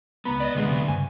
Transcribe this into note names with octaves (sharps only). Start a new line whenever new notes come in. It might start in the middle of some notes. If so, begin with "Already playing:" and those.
C#2 B3 A#5 B5
D5 D#5
D2 A#2 G#3
C3 F#3
G2 C#3 G#5